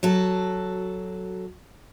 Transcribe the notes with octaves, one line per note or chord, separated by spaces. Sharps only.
F#3 F#4 A4